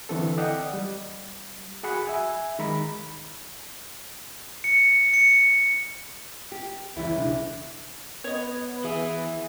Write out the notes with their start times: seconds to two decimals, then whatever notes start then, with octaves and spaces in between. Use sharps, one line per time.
0.09 D3 E3 C4 A4
0.38 D5 D#5 F#5 G5
0.73 G3
1.83 F#4 G#4 F#5 B5
2.07 E5 G#5
2.59 D#3 G#3 A#5 B5
4.64 C#7
5.14 C#7
6.52 G4
6.96 C#2 E3 G3 E4
7.16 B1 C#3 D4
8.24 B3 C#5 D#5
8.84 E3 G#4 E5 D#6